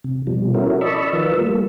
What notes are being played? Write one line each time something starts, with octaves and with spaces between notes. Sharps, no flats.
C3
B2 F3 G3
C#4 E4 F#4 A4 A#4
D5 D#5 A5 B5 C#6 E6
D#3 F3 F4 A#4 B4 E6
G3 A3 A#3